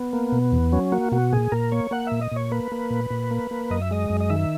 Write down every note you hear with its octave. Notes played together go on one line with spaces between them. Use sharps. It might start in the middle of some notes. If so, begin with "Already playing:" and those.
Already playing: B3
A#3
B2
E2
F#3 C#4
A#3 F#4
B2 F#4
A#2 G#4
A#2 A#4
A#3 C#5
A#3 F#5
A#2 E5
D#5
A#2 C#5
A#3 B4
A#3
A#2
A#2
A#3
A#3
F#2 D#5
E5
G#3 D#5
F#2
D#5
D#3 E5